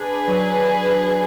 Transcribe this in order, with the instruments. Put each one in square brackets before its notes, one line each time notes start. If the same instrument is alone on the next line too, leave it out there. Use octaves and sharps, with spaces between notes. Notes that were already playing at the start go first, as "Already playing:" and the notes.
Already playing: [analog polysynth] D4 [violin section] G#4 B4
[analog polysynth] F#3